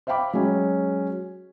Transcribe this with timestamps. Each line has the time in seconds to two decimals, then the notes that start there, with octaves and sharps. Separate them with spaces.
0.07 C5 E5 F5 G5 B5 D6
0.33 F#3 G#3 C#4